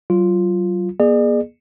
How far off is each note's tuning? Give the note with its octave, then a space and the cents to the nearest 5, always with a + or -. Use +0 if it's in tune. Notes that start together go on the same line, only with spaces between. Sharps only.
F#3 +30 F4 +0
A#3 +45 G#4 +0 D5 +40